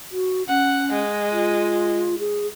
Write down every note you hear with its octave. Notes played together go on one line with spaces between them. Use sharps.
F#4
C#4 F#5
G#3
F4
G#4